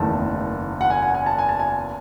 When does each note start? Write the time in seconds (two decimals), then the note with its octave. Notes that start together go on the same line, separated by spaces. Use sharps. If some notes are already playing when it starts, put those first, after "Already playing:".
Already playing: F#1 E2 D#3 A3 A5
0.81 F#5
0.90 G#5
1.03 G#5
1.15 G#5
1.26 A5
1.38 G#5
1.49 A5
1.59 G#5